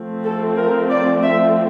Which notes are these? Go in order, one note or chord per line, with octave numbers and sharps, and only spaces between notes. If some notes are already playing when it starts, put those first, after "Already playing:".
Already playing: F3 A3 C4
A4
A#4
D5
E5